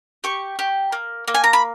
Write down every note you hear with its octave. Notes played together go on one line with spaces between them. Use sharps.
G4 C#6
G4
A#3
A#3
G#5
A#5
B5